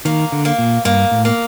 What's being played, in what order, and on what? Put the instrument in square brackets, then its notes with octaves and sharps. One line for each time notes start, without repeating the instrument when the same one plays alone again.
[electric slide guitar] D#3 [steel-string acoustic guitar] A#3
[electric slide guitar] D3
[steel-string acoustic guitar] A#3
[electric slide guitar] A#2
[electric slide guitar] G2 [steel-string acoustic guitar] A#3
[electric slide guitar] A2
[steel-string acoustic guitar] A#3